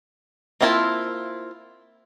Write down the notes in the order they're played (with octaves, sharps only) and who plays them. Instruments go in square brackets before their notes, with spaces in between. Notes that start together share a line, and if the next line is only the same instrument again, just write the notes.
[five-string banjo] A#3 C4 E4 F4 A5